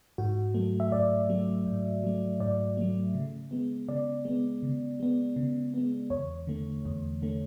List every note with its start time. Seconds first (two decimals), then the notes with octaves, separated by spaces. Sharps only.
0.18 G#2 F#4
0.54 F#3 A3
0.80 E5
0.92 G#2 D5
1.29 F#3 A3
1.66 G#2
2.03 F#3 A3
2.40 G#2 D5
2.77 F#3 A3
3.14 C#3
3.51 G#3 B3
3.88 C#3 D5
4.25 G#3 B3
4.63 C#3
5.00 G#3 B3
5.36 C#3
5.74 G#3 B3
6.10 E2 C#5
6.47 D3 A3
6.85 E2
7.22 D3 A3